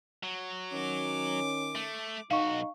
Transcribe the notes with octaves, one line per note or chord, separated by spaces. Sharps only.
F#3
D#3 C#4 D6
A3
B1 D#4 F#4 F5 C#6